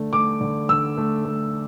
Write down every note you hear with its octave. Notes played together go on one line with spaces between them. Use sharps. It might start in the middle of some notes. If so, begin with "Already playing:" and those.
Already playing: D3 A3
A3 D6
D3
D3 E6
A3
A3